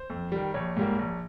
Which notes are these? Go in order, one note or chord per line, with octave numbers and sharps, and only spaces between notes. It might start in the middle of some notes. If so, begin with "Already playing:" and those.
Already playing: C5
F2
D#3 G3
A#1 C#5
G#2 G3 A#3
A#1